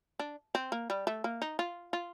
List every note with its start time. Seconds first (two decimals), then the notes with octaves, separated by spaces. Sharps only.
0.19 D4
0.55 C4
0.72 A#3
0.90 G3
1.07 A3
1.24 A#3
1.42 D#4
1.59 F4
1.93 F4